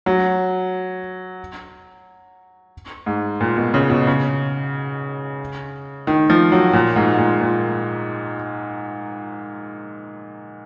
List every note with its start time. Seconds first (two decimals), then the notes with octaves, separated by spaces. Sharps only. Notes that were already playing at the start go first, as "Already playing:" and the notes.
0.06 F#3
3.06 G#2
3.41 A#2
3.57 B2
3.74 C#3
3.90 B2
4.07 C#3
6.07 D#3
6.30 F3
6.52 F#3
6.73 A#2
6.96 G#2
7.14 G#2
7.18 A#2
7.41 A#2